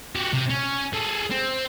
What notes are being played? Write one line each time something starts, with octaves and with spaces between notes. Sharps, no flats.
F#4 G4
C3
C#4
G#4 A4
C4